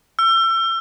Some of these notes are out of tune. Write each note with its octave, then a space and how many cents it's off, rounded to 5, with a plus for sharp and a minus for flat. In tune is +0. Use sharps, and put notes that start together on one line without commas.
E6 +30